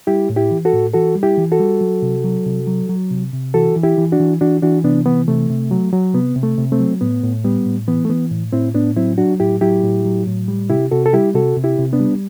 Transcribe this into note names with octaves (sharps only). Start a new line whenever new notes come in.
G3 E4 G4
A2
E4 G4
E3
F#4 A4
A2
E3 F#4 A4
G3
E4 G4
E3
F#4 A4
G3
F#3
C3
F#3
C3
F#3
F#3
C3
C3
E3 F#4 A4
E3
E4 G4
E3
D4 F#4
E3
E3 D4 F#4
E3 D4 F#4
C3 B3 D4
E3 B3
C3 A3
C3
F#3
F#3
C3 B3
C3
A3
C3
A3 C4
F#3
A2 B3
A2
G3 B3
A2
E3 B3
A3
E3 B3
A2
A2 C4 E4
A2 B3 D4
F#3 C4 E4
F#3 D4 F#4
A2 E4 G4
F#3 E4 G4
A2
F#3
A2
G3
C3 E4 G4
C3 F#4 A4
A4
G3 E4 G4
C3 F#4 A4
C3
E4 G4
C3
B3 D4
G3